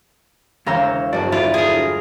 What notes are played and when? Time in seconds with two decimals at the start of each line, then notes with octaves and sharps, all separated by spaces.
0.67 E1 C#3 C#4 C#5 F5 A#5 E6 G6
1.13 G1 F#3 G#3 A3 F#4 D5 A5
1.32 D3 F#3 E4 F4 D5
1.54 G#4 A#4